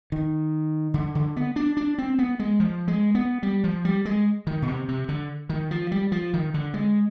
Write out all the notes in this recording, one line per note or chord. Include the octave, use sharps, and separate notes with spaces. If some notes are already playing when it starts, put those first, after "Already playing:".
D#3
D3
D3
B3
D4
D4
C4
B3
G#3
F3
G#3
B3
G3
F3
G3
G#3
D#3
B2
C3
C3
D3
D#3
F3
G3
F3
D#3
D3
G#3